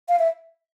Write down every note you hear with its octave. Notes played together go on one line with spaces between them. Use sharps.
F5
E5